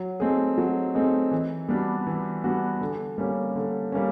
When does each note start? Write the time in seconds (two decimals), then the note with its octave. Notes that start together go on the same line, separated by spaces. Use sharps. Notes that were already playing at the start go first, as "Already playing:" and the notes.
Already playing: F#3
0.20 A3 C4 D#4 G#4
0.58 F#3
0.95 A3 C4 D#4 G#4
1.31 E3
1.69 G3 B3 D4 F#4
2.07 E3
2.44 G3 B3 D4 F#4
2.81 D3
3.18 G3 A#3 C#4
3.55 D3
3.92 G3 A#3 C#4